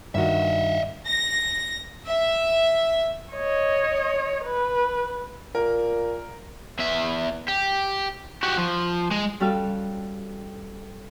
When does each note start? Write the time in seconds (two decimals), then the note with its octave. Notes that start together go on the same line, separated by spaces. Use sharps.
0.15 G2 D#3 F#4 D#5 E5
1.06 A#6
2.06 E5
3.33 C#5 D#5
4.45 B4
5.55 A#2 A#4
6.79 E2 E5
7.48 G4
8.43 F#4 G4
8.58 F3
9.11 G#3
9.40 G3 C#4 F#4 G4 A4 F5